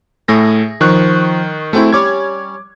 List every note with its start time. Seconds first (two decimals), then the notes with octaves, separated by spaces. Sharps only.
0.28 A2 A3 G#4 E5 A#6
0.81 D#3 F3 C#6 F#6
1.73 G#3 A3 C4 E4 F#4 G5
1.93 G3 C#4 C#5 D6 G#6